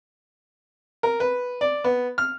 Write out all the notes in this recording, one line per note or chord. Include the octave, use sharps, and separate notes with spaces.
A#4
B4
D5
B3
F6